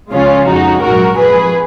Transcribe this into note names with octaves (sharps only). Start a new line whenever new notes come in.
C#2 C#3 F3 G#3 C#4 F4
F2 F3 G#3 D#4 F#4
A#1 G#2 F#3 F#4 A#4
F2 F3 G#3 G#4 B4